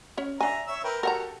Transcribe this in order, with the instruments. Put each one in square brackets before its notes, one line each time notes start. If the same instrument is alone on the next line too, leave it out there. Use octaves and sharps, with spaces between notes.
[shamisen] C#4 C#5
[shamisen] D4 G#5 [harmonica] E5 A#5
[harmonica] C#5 E5 E6
A#4 B4 G5
[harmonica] F#4 G4 A4 [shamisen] A#4 F#5 A#5